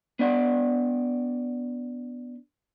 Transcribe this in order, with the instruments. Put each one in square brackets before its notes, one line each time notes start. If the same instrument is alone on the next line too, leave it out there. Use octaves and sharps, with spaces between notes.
[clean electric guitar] B3 D4 D5 F#5